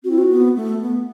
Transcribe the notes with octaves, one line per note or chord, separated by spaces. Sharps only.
C4 F#4
E4
F#4
B3
A3
B3